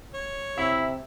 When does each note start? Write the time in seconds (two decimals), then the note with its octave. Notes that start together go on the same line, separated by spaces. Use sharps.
0.14 C#5
0.58 C3 E4 E5